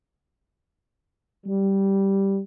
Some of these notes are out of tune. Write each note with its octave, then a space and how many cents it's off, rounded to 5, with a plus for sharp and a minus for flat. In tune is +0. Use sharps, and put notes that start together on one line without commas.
G3 -5